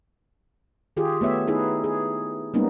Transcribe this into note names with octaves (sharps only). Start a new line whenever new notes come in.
D#3 F4 G4 G#4
A3 B3 C#5 E5
D#4 E4 G#4 B4
G#4
G3 G#3 A#3 B3 C#4 D#4